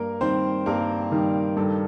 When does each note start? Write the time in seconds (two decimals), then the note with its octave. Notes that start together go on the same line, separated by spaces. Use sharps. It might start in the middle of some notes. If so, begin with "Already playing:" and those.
Already playing: G2 A#3 A#4
0.21 D#3 G3 C4 C5
0.66 G2 A#3 A#4
1.11 D#3 G3
1.56 G2 A4